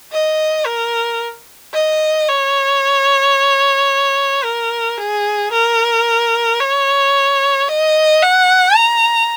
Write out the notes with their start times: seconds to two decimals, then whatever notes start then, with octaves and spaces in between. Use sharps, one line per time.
0.13 D#5
0.66 A#4
1.74 D#5
2.29 C#5
4.44 A#4
4.98 G#4
5.52 A#4
6.60 C#5
7.68 D#5
8.23 F#5
8.76 A#5